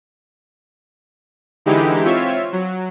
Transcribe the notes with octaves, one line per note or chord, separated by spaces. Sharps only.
D3 E3 G#3 D#4 E4 G4
C4 F4 C#5 E5
F#3